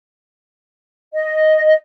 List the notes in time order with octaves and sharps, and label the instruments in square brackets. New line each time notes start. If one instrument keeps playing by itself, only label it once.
[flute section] D#5